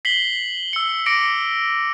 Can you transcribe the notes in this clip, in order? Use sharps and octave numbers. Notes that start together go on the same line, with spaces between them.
B6 C7 F#7 G7
E6 C#7
D6 A#6 C#7 D7